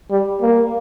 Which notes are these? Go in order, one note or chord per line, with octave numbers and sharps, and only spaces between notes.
G3
A#3